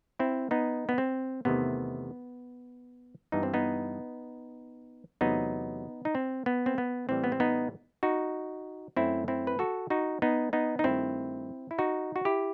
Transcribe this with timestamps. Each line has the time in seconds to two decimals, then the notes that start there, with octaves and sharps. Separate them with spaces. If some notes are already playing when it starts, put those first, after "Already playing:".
0.19 C4 E4
0.51 B3 D#4
0.89 B3
0.98 C4
1.45 E2 C3 D#3 A3 B3
3.32 G2 E3 B3 D#4
3.43 C4
3.54 B3 D#4
5.21 E2 C3 F#3 A3 B3 D#4
6.05 D#4
6.15 C4
6.46 B3
6.66 C4
6.78 B3
7.09 A2 E3 G3 C4
7.24 B3
7.32 C4
7.40 B3 D#4
8.03 D#4 F#4
8.97 F#2 F#3 A3 C4 E4
9.28 C4 E4
9.47 B4
9.59 F#4 A4
9.90 D#4 F#4
10.22 B3 D#4
10.53 B3 D#4
10.79 D#4
10.84 G2 D#3 A3 C4 E4
11.71 E4
11.78 D#4 F#4
12.16 F#4
12.25 E4 G4